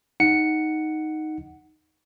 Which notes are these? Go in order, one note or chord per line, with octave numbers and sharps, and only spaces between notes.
D#4 F#5 C#7